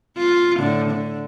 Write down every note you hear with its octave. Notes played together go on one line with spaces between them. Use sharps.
F4
A2 D3
D3